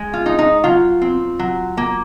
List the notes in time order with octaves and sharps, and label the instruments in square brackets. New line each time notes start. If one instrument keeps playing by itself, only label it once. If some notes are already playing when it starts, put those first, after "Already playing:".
Already playing: [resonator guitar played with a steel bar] G#3
F4
D#4
D#4
F#3 F4
C4
F#3
A#3